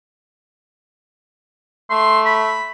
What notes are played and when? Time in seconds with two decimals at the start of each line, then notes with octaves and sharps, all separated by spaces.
1.90 A3 C6
2.26 B5